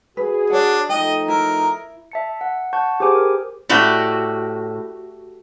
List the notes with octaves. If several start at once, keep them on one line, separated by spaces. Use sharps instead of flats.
F#4 G#4 B4
D4 C#5 F#5
F3 A3 D#4 D#5 G5
E4 A#4
E5 A5 C#7
F#5
F#5 A5 C#6 G6
G4 G#4 C5 G#5 D6
A#4
A2 F#4 G4 D5